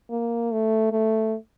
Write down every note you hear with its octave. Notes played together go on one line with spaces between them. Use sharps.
A#3
A3
A3